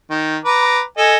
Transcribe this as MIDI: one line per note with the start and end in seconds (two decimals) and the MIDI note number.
0.10 0.37 51
0.45 0.80 71
0.45 0.80 82
0.45 0.80 86
0.98 1.18 69
0.98 1.18 75
0.98 1.18 80